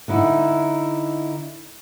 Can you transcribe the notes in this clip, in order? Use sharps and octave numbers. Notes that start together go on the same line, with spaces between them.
D3 D#4 E4